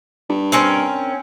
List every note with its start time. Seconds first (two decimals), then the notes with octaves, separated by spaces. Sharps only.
0.30 G2
0.52 C4 C#4 A#4